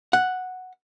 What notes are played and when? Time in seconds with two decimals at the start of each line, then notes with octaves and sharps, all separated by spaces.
0.13 F#5